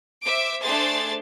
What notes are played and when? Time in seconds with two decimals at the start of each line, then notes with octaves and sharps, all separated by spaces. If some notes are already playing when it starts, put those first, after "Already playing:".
0.23 C5 E5 D6 D7
0.62 A3 D4 G#4 C5 C6 A6